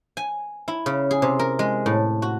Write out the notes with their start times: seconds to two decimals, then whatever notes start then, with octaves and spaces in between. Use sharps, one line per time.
0.17 G#5
0.68 E4
0.86 C#3
1.11 G#4
1.22 C3
1.39 A#4
1.59 G#3
1.86 A2
2.22 F#4